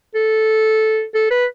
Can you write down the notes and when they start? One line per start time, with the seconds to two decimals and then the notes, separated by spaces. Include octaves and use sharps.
0.15 A4
1.15 A4
1.31 B4